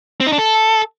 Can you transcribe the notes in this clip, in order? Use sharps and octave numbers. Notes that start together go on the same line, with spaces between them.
C4
D#4
D4
A4